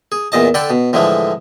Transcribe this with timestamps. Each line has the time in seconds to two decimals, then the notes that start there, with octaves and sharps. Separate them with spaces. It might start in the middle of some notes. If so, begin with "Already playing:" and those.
0.12 G#4
0.32 E2 A#2 D#5 A5
0.54 D3 D4 A4 G5 B5
0.70 B2
0.93 A2 D3 E3 F3 G#3